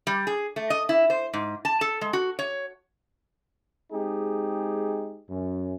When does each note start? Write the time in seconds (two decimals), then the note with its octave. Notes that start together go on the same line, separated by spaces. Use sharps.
0.07 G3
0.27 G#4
0.56 A3
0.70 D#5
0.89 E4
1.10 C5
1.34 G#2
1.65 A5
1.81 A4
2.01 G#3
2.13 F#4
2.39 C#5
3.93 G#3 C4 D#4 G4 G#4
5.30 F#2